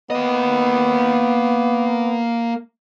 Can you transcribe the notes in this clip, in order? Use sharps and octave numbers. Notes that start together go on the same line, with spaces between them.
A#3 B3 D#5